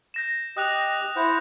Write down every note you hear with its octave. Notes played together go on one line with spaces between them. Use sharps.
G6 A#6 E7
G4 D#5 D#6 F#6 F7
E4 C5 F#5